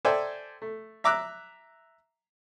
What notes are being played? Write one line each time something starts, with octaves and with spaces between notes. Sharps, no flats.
A4 C5 D5 E5 G5 G#5
A3
E5 A#5 D6 E6 F#6